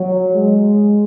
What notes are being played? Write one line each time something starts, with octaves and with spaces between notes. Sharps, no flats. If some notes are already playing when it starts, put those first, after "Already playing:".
Already playing: F#3
G#3